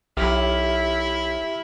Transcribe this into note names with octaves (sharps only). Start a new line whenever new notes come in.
B1 E4 G4 E5 F6